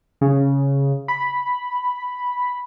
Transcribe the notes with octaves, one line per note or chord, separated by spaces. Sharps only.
C#3
B5